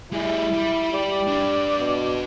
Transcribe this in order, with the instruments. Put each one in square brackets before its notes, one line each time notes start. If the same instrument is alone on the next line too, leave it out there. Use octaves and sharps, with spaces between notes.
[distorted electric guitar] G3 G#4 [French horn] E4
[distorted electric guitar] G3
[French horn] G4 [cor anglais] D5
[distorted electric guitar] D4 B4
[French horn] B2